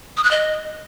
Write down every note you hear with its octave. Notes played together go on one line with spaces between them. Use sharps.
D#6
F#6
D#5